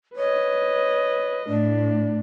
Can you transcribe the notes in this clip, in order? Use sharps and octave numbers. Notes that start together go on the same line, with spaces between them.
B4 C#5 D#5
A2 D4 D5